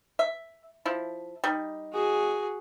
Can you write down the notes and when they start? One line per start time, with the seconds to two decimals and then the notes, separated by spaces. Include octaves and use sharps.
0.19 E5
0.86 F3 E4
1.44 G3 D#4
1.93 F#4 G#4